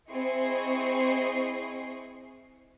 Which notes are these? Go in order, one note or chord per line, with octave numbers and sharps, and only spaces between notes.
C4 E4 G#4 D#5 C#6 C7